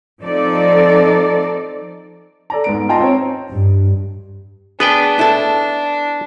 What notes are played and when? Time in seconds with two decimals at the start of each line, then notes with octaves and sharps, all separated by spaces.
0.21 F3 C4 D#4 A4 D5
2.50 A4 D5 A#5
2.64 G#2 B3 D7
2.89 F4 D#5 G5 A5 A#5 C6
3.01 C4 C5 C#5
3.50 G2
4.80 B3 D4 G#4 B4 G5
5.19 E4 A4